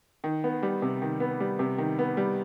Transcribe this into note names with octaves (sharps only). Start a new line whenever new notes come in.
D#3
B3
G3
C3
D#3
B3
G3
C3
D#3
B3
G3